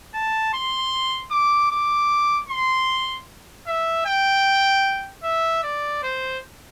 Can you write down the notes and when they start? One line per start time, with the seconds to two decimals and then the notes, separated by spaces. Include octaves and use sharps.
0.14 A5
0.53 C6
1.31 D6
1.71 D6
2.49 C6
3.67 E5
4.06 G5
5.23 E5
5.63 D5
6.03 C5